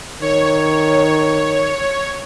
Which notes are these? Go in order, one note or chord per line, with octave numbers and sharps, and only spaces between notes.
D#3 C#5